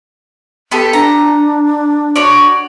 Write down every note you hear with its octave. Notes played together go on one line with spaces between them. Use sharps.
B3 G4 A4
D4 A#5
F#4 C#5 D5